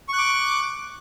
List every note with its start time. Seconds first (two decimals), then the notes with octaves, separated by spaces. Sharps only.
0.08 C#6
0.13 F#6
0.18 D6